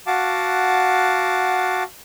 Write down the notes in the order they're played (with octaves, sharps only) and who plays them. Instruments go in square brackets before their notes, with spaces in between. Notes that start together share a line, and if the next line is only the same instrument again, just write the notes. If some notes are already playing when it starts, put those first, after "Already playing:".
[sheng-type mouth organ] F#4 F5 F#5 A5 D6